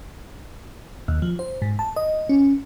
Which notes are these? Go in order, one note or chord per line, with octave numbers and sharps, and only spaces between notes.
D#2
F3
C5
G#2
A5
D#5
C#4